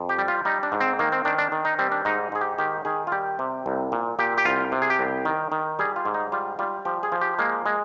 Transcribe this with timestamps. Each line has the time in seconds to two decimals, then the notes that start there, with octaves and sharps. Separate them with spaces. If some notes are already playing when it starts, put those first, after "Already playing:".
Already playing: F2
0.09 G4
0.18 G3
0.28 F4
0.45 G3 D#4
0.63 D4
0.72 G#2
0.80 C4
0.99 D#3 A#3
1.12 C4
1.25 D#3 D4
1.38 D4
1.52 D#3
1.65 D#4
1.79 G3 C4
1.92 D4
2.05 G#2 D#4
2.32 G#2 G#4
2.41 G4
2.58 D#3 G4
2.85 D#3 G#4
3.07 F4
3.12 G3 G4
3.39 C3
3.66 C2
3.92 A#2
4.19 A#2 G4
4.38 G4
4.45 C2 F4
4.72 C3
4.82 G#4
4.90 G4
4.99 C2
5.25 D#3
5.52 D#3
5.79 G3 G#4
5.96 F4
6.05 G#2
6.14 D#4
6.32 G3 F4
6.59 G3 F4
6.85 F3 G4
7.03 G#4
7.12 F3
7.21 G4
7.39 G#3 A#3
7.66 G#3